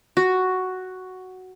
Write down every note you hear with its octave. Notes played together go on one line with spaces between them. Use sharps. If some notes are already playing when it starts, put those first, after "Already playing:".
F#4